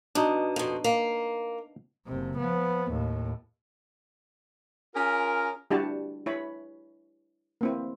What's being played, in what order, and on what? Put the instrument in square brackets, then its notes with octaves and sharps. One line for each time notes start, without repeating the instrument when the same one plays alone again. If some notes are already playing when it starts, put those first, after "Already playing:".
[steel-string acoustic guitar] B2 [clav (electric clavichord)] D4 D#4
[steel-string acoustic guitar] F2 B2
A#3
[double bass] F#1 C3
F3 B3
D#2 A2
[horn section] C#4 F4 G#4 A#4
[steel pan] G3 D4 E4 F#4 G4 A5
E4 C#5 B5
A#3 C4 E4